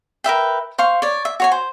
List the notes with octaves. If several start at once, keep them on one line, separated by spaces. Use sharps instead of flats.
A#4 B4 E5 G5
C5 F5 C#6
C#5 D5
E5
F#4 C#5 G#5
C5